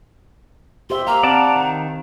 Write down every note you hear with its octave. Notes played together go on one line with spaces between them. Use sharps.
G4 C5 E5 C6
A#3 F5 A#5
C4 D5 F#5 A5
D#3